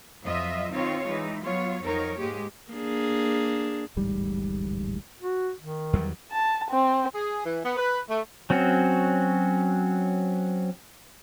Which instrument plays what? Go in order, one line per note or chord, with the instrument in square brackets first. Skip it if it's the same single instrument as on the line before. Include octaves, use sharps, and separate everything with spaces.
[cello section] F2 F#3 F4 D#5 E5
D#3 C4 D#4 F4 C#5
E3 G#3 D#4
F#3 B3 F4 C#5
F2 F#3 D#4 A#4 C#5
G#2 G#3 A#3 G4
[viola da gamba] A#3 D4 G#4
[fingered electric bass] D1 A1 G#2 G3
[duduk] F#4
D#3
[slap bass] E2 F#3 G3
[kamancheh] A5
C4
[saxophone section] G#4
E3
B3
B4
A3
[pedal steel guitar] F#3 C4 C#4 F#4